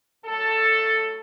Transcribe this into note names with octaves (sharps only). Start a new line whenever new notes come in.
A2 F#3 A3 A4